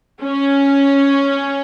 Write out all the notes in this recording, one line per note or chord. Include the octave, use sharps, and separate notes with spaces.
C#4